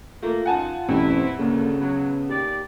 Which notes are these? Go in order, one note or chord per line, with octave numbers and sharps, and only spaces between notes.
A3 A#3 F4
F#2 D#4 F#5 G#5 A5
A1 G2 B2 C4 E4
D2 C#3 A#3
F#3 B3
D#2 G4 D5